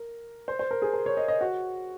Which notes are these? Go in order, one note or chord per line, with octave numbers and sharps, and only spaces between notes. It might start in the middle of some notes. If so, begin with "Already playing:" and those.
Already playing: A#4
C5
C5
A#4
G#4
A#4
C#5
D#5
D#5
F#4